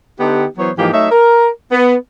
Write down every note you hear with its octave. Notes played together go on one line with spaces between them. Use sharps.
D3 B3 D#4 G4
E3 F#3 B3 E4 C5 C#5
G#2 E3 F3 A#3 D#4 G4
F#3 A3 D#4 C#5 E5
A#4
B3